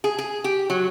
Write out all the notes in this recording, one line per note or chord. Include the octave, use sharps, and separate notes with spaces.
G#4
G#4
G4
F#3